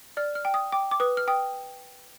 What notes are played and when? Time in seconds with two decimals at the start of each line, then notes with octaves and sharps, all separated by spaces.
0.17 D5 F6
0.35 F6
0.45 G5
0.54 D#6
0.72 G5 D6
0.91 D6
1.00 B4 D#6
1.17 F6
1.28 G5 D#6